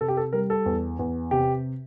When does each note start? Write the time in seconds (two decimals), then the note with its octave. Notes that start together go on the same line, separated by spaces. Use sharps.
0.01 C3 A4
0.08 G4
0.17 A4
0.33 G3 A#4
0.50 A4
0.66 E2
0.99 E2
1.31 C3 G4